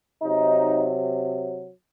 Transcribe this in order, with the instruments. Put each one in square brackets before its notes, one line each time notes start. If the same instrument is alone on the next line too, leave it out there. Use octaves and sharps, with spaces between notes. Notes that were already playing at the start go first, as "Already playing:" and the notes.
[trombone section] C3 F#3 D#4